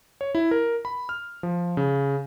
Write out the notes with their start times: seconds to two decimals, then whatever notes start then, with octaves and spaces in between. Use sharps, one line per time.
0.21 C#5
0.35 E4
0.51 A#4
0.85 B5
1.09 F6
1.43 F3
1.77 C#3